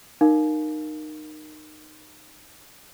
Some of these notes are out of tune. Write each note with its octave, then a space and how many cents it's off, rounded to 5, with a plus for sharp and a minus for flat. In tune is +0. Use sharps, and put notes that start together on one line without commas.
D#4 -20 A#4 +0 F5 +0